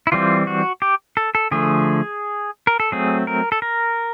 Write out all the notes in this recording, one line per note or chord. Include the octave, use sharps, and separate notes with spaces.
E4
E3 G3 C4 F4
F#4
G4
A4
A4
D3 F3 A3 G#4
A#4
A4
F#3 A3 C4 G#4
A#4
A4
A#4